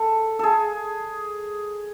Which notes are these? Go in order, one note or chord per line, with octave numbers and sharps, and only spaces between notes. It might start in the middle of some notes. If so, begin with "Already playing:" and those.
Already playing: A4
G#4 A4